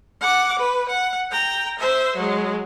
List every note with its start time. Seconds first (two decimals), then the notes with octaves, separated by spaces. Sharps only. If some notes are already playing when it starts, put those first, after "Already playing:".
0.21 F#5 D6
0.59 B4
0.89 F#5
1.31 G5 A#5
1.79 C5 E5
2.16 F#3 G#3